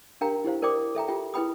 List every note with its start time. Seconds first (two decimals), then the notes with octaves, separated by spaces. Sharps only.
0.21 D4 G4 A#4 F5 G5 A#5
0.45 E4 G4 C5 F5
0.62 A#4 C5 D5 G5 D6 D#6
0.95 A4 E5 G5 A#5
1.08 F4 G4 G5
1.34 E4 G#4 B4 G5 B5 D#6